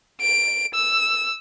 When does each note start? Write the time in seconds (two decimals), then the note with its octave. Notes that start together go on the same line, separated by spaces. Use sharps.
0.22 D7
0.75 E6